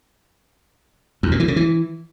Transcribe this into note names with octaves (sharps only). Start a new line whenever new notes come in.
E2
A#2
E3
C#3
E3